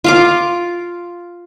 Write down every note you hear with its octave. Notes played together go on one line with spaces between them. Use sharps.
F4 F5 D6